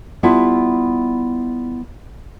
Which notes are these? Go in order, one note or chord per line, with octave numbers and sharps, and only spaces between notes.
G3 B3 E4 F4 E5 A5